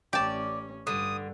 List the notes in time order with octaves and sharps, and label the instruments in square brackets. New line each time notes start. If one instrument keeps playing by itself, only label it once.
[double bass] A1 C#4 [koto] G4 A5 [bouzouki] D5
[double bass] G2 [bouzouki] D3 [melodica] D#6